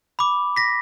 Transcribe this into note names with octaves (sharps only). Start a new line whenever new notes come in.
B5 D6
A#6 B6